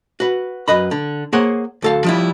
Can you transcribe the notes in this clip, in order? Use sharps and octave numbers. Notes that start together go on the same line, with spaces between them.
F#4 B4
F#2 B4 D#5 B5
D3
A#3 G#4 C5 C#5 F#5
D2 A4 F5
F3 G3 E4